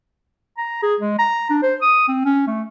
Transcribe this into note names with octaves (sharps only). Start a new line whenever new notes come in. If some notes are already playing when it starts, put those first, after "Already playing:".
A#5
G#4
G#3
A#5
D4
C5
D#6
C4
C#4
A3